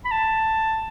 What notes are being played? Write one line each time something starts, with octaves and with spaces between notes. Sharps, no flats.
B5
A5